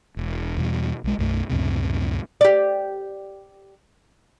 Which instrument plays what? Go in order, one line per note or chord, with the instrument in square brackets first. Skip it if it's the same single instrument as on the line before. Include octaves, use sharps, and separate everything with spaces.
[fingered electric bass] E1
E2 B2 G3
B1 G#3
B1 F#2 A3
C#2 F#2 A2 C3
[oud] G4 D5